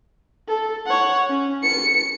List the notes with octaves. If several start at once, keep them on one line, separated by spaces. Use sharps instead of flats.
A4
C#5 F#5
C#4
C#7